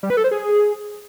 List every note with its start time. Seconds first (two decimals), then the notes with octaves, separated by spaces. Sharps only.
0.03 G3
0.10 B4
0.17 A4
0.24 C5
0.31 G#4